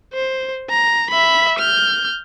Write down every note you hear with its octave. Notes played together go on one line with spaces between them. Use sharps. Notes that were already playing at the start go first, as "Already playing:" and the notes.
C5
A#5
E5 B5
F6 G6